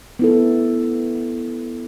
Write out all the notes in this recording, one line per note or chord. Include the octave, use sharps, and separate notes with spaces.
B3 E4 A4